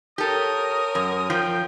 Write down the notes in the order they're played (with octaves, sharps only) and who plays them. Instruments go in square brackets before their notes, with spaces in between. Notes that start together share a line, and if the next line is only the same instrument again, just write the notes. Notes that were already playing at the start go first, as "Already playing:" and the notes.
[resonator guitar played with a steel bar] G4 A4 [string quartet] A#4 C#5 [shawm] D#6
[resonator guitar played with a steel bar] F#2
[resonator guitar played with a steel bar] F3 [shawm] G5